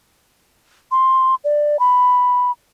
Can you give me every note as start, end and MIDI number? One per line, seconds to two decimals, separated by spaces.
0.91 1.35 84
1.44 1.79 74
1.80 2.51 83